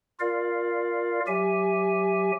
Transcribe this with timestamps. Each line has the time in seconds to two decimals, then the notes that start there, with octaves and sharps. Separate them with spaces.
0.20 F4 A#4 D5 F5
1.27 F#3 G4 E5 G#5